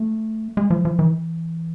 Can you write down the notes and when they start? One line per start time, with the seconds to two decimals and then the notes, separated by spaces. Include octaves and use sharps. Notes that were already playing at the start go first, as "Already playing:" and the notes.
Already playing: A3
0.57 G#3
0.70 F3
0.85 F3
0.99 E3